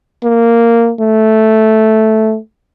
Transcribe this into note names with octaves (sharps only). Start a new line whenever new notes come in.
A#3
A3